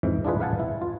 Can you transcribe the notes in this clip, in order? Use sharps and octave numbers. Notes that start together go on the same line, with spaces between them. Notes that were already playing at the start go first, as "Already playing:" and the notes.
F2 G#2 E3
D4 E4 F4 G#4 B4
B4 F5 F#5 G#5 A5
E4
F4